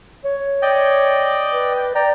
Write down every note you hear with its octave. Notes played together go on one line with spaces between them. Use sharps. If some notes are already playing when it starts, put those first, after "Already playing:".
C#5
D5 D#5 G5
B4
D5 G5 A#5